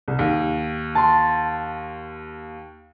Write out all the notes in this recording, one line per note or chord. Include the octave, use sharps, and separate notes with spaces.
C2
D#2
A5 C6